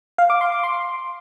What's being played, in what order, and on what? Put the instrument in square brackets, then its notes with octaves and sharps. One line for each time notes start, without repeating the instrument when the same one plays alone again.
[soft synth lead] F5
D6
C6
D6
C6